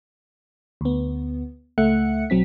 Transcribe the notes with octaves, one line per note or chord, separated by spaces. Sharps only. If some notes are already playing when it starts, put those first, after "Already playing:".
D2 B3
C#2 A3 E5 F#5 F#6 C#7
B1 F#3 C4 B6